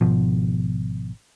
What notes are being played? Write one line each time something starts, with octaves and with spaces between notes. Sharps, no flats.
G#1 B2 F3